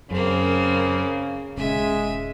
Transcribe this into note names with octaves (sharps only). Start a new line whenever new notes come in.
F#2 C#3 A#3 C4
D#1 C#3 G#3 E5 D#7